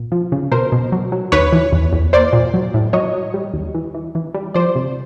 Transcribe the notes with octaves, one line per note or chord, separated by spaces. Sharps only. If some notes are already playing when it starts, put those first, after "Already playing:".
Already playing: A#2
F3
C#3
B2 A#4 C5
B2
F#3
F#3
D#2 B4 C#5
E3
E2
E2
A#3 C5 D5
A#2
F#3
A2
F#3 C#5 D#5
F#3
G3
D#2
E3
E3
E3
G3
F3 C5 D5
C3